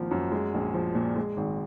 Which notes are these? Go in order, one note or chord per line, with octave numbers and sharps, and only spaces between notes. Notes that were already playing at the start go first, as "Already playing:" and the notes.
Already playing: G#1 F3 A#3
F#2
G#3
A#1
F3
A#2
G#3
G#1